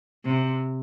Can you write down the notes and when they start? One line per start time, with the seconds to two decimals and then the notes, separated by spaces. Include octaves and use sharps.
0.25 C3